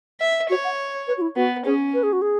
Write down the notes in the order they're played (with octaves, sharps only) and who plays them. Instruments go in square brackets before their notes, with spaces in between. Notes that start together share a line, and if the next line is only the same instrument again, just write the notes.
[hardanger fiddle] E5
[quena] F#4 [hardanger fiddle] C#5
[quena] F#5
B4
F#4
E4
[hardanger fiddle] B3 [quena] F#4
[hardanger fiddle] C#4 [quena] G#4
[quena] B4
G#4
F#4
G#4